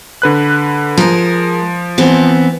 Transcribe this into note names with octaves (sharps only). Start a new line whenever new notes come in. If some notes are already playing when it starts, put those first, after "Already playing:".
D3 B4 F#6
F3 G#3 A#4
E3 B3 C4